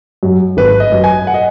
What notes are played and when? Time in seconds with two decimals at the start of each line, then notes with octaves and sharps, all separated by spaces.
0.23 F#2 F#3
0.57 G#1 B4
0.80 D#5
0.92 F#2 F#3
1.04 G#5
1.27 F#5
1.34 D#5